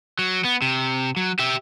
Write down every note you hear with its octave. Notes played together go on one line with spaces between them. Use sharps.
F#3
B3
C3
F#3
G4 E5